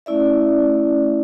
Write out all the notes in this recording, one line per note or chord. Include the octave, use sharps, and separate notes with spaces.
A3 C#4 E4 D5 E5